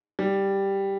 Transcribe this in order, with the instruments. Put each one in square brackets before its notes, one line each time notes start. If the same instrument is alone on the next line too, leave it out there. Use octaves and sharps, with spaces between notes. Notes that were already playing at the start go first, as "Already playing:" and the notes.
[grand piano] G3